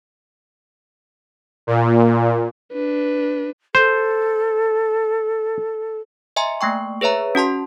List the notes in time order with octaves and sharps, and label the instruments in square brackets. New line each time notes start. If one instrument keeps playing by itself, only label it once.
[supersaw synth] A#2
[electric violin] D4 B4
[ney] A4 [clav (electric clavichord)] C5
[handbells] D#5 E5 G#5 A#5 C6
A3 A#3 G5 C#6
G#4 B4 C#5 E5 A#5
C#4 F#4 A5 C6